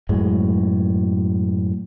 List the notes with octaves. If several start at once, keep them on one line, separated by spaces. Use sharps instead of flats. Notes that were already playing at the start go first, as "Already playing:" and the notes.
F#2 A2 G#3